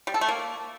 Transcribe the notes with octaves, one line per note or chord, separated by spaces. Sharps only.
G3
A4
A3
A#3